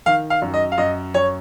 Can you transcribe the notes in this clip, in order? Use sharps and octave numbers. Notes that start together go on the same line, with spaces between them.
D#3 F5
F5
F#2
D#5
F5
F#2 D#5
F#2 C#5